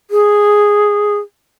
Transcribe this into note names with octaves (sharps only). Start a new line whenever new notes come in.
G#4